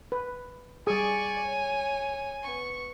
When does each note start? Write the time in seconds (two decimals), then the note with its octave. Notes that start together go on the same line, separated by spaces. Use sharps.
0.12 B4
0.87 G3 G#4 D5 G#5 C#6
1.45 C#5
2.43 B3 C#6